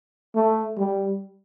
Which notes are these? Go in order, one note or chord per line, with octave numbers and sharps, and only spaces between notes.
A3
G3